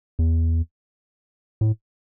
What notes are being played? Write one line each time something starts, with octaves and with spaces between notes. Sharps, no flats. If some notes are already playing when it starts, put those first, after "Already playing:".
E2
A2